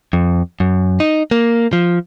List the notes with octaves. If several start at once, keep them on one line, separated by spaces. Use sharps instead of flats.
F2
F#2
D#4
A#3
F3